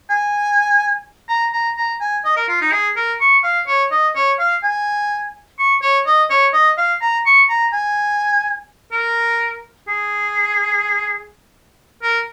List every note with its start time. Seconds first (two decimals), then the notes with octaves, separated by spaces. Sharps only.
0.10 G#5
1.29 A#5
1.53 A#5
1.77 A#5
2.01 G#5
2.25 D#5
2.36 A#4
2.49 F4
2.61 D#4
2.72 G#4
2.96 A#4
3.21 C#6
3.44 F5
3.67 C#5
3.91 D#5
4.15 C#5
4.39 F5
4.63 G#5
5.59 C#6
5.82 C#5
6.06 D#5
6.30 C#5
6.53 D#5
6.78 F5
7.01 A#5
7.26 C#6
7.49 A#5
7.73 G#5
8.92 A#4
9.88 G#4
12.02 A#4